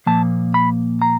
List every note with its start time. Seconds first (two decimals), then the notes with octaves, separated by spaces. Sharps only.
0.06 A#2 F3 A#3 A5
0.54 B5
1.02 A#5